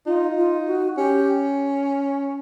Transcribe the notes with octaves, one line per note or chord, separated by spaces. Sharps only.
D#4 F4
F4
F#4
C#4 G4